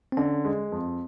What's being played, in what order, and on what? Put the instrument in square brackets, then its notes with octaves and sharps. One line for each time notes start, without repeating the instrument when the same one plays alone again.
[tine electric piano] C4
[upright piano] D3 [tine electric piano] C#4
[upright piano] G#3
F2